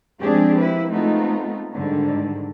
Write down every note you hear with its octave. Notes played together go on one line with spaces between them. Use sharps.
F3 G#3 C4 D4 G4 G#4
A#3 E4 B4
G#3 A3 B3 C4 D#4 F4
G#2 D3 D#3 G3